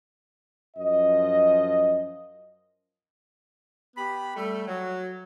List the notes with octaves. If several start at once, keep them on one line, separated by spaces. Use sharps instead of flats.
F#2 F3 D#5
B3 G4 B5
G3 A3
F#3